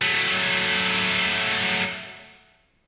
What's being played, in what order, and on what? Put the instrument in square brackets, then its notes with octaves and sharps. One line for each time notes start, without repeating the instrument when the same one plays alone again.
[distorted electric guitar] F#3 A3